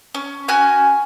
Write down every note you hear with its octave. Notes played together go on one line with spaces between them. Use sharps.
C#4
C#4 F#4 G#5 F6